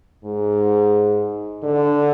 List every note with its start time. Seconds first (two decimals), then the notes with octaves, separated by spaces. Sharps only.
0.25 G#2
1.63 D3